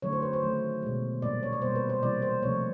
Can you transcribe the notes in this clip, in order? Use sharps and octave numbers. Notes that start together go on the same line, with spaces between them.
D3 F#3 A3 C#5
C5
B4
C5
D#3 F#3 A3
B2 G#3
A#2 G3 A#3 D5
C#5
D5
B2 G3 A#3 C5
B4
C5
C3 E3 G3 A#3 D5
C5
C3 F3 A3 C#5